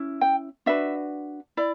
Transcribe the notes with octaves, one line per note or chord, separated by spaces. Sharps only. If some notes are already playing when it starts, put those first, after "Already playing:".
Already playing: C#4 E4
G5
D4 F#4 B4 E5
E4 D5